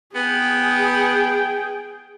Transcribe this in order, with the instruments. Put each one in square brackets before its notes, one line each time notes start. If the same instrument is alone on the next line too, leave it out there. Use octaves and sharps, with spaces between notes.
[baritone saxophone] B3 [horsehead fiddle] G#4 [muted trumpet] G5